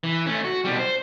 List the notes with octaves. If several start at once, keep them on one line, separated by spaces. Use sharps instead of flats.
E3
A3 C#4
F#4
B2 G3
C5